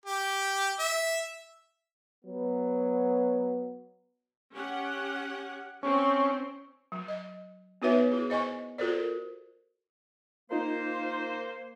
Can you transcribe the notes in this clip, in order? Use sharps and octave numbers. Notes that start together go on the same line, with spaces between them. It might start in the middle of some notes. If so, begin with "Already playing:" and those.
G4
E5
F#3 B3
C#4 G4 F#5
C4 C#4
F#3
D#5
B3 D#4 F#4 B4 C#5 E5
E4 G#4
C5 D#5 G#5 C#6
F4 F#4 A4 A#4 C5 D5
A#3 D#4 F4 A#4 C5